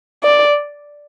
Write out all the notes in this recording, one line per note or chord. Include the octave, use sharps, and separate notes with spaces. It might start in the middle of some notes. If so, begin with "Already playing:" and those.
D5